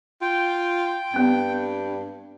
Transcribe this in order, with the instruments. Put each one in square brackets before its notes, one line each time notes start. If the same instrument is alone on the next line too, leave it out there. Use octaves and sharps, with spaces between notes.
[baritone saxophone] F4 [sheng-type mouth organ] G5
[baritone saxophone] G2 [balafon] B3 C4